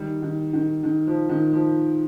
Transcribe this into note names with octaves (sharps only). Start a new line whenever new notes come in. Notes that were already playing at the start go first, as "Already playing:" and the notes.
Already playing: D#3 G3
D#3
D#3
D#3
F3
D#3
F3